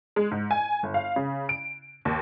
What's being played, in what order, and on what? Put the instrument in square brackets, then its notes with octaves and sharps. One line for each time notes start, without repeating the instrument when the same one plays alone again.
[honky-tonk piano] G#3
G#2
G#5
G1
F5
C#3
D7
D#2